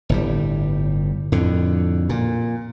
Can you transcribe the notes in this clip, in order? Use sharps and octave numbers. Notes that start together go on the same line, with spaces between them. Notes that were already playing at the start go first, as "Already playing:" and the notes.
G1 A2 G3
F2 A2 D3
A#2